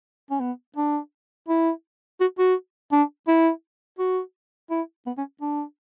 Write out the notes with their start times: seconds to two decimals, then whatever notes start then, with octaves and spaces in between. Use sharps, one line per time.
0.31 C#4
0.41 B3
0.77 D4
1.49 E4
2.21 F#4
2.39 F#4
2.92 D4
3.28 E4
3.99 F#4
4.70 E4
5.07 B3
5.18 C#4
5.41 D4